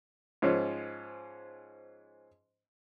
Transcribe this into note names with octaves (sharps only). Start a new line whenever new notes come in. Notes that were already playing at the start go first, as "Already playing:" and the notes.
G#2 F3 C#4